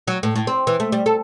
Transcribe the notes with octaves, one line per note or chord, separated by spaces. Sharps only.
F#3
A2
A2
C4
E3
A3
G3
A4